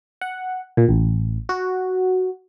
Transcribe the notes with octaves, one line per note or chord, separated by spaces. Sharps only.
F#5
A#2
A1
F#4